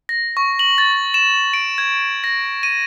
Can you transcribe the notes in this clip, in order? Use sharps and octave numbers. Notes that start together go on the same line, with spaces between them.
A#6
C#6
F#7
A6
E7
D7
G#6
A#6
D#7